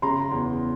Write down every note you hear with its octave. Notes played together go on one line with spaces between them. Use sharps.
C#3 A#5 C6
E2